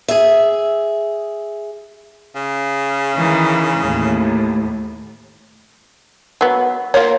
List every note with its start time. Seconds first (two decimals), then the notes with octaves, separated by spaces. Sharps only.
0.08 G#4 E5
2.35 C#3
3.15 D#3 E3
3.80 D#2 A2
6.41 F#3 B3
6.94 A#3 F4 C#5